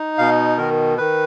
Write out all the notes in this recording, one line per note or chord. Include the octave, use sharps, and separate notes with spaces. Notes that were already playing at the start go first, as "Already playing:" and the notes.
Already playing: D#4
B2 F5
D#3 A#4
D#3 B4